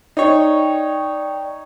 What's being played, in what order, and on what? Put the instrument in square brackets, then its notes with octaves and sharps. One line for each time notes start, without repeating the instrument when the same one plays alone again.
[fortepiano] D#4 C#5 [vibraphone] D5 G5 C#6